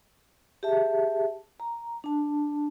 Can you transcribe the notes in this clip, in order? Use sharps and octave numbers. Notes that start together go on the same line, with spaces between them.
G4 G#4 E5 A5
A#5
D4 A5